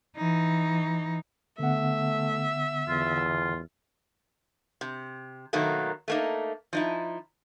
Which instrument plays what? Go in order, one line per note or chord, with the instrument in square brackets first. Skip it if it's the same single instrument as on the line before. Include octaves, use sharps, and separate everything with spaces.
[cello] E3 D#4
[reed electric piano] D3 B3 F#5 [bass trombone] A3 [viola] E5
[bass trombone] E2 [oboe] F4
[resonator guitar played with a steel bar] C3
B2 D#3 F#3 A3 A#3
A3 A#3 D#4
F3 D#4 E4